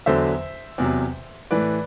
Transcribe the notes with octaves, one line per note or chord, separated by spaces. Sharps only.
E2 D3 F#3 C5 E5
E2 C3 F#3
A2 E3 B4 D5